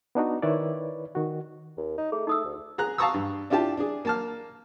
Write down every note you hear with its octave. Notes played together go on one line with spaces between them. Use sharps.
B3 D4 D#4 F#4
D#3 E4 B4 C#5 D5
D#3 F#4
D#2
D#4
A3 G#4
A3 D#4 D#6 E6
D2
G#4 A#5 F#6
F5 A5 A#5 C#6 D#6 E6
G2
D4 E4 F4 G4 A5
D4 G#4
A#3 A5 F6